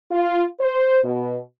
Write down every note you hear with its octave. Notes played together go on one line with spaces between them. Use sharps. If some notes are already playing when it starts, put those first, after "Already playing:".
F4
C5
B2